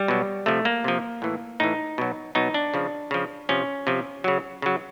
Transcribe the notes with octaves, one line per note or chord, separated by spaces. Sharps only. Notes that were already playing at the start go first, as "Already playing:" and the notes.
Already playing: G3
B2 F#3
C3 F3 A3
A#3
C3 F3
A2 E3
A2 E3 D#4
B2 F#3
B2 F#3 D#4
D4
C#3 F3
C#3 F3
C3 F3 C#4
C3 F3
C#3 F#3
C#3 F#3